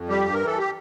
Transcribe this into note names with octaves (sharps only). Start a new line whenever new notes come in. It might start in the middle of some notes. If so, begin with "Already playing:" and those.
Already playing: F2
G3 G4
G2
A#4
E3 A4
G4